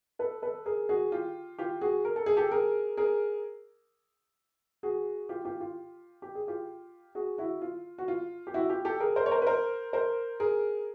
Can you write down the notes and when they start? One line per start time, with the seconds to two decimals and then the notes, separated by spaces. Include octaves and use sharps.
0.19 A4 B4
0.42 A4 B4
0.66 G#4 A#4
0.89 F#4 G#4
1.12 F4 G4
1.58 F4 G4
1.81 F#4 G#4
2.05 A#4
2.16 A4
2.26 G#4
2.37 G4 A4
2.51 G#4 A#4
2.97 G#4 A#4
4.83 F#4 G#4
5.29 F4 G4
5.45 F4 G4
5.60 F4 G4
6.22 G4
6.35 G#4
6.48 F4 G4
7.15 F#4 G#4
7.38 E4 F#4
7.62 F4
7.98 F#4
8.08 F4
8.47 G4
8.54 E4 F#4
8.69 F4 G4
8.85 G4 A4
9.00 G#4 A#4
9.16 A#4 C5
9.26 C#5
9.31 A#4 C5
9.42 B4
9.47 A#4 C5
9.93 A#4 C5
10.40 G#4 A#4